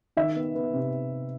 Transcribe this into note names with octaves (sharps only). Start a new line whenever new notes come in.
D#3 E5
B3
B3
C3